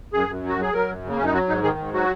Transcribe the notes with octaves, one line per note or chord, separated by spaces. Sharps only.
F#2 G#4
F#2
F#3
F#4
F#3 G#4
F#3 A#4
F#2
C#3
A#3
F#2 C#4
D#4
F#3 F#4
G#2 D#4
D#3 G#4
G#2
F#3 F#4